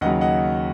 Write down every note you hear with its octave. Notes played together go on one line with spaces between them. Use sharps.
D#2 C#3 F#3 D#5 F#5
D#5 F#5